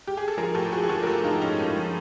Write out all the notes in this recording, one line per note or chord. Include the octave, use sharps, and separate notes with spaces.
G4
G#4
A4
F3 G#4 A#4
A2 G4 A4
F3 F#4 G#4
G#4
F3 G4 A4
A#4
F3 G4 A4
F3 D#4 F4
A2 C#4 D#4
A2
F3